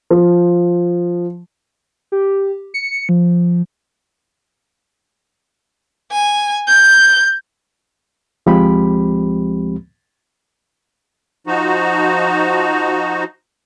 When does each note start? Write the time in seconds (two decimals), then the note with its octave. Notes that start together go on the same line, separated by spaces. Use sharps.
0.10 F3
2.12 G4
2.74 C#7
3.09 F3
6.12 G#5
6.68 G6
8.46 D2 F3 G#3 C4 G4 B5
11.47 F3 D#4 F#4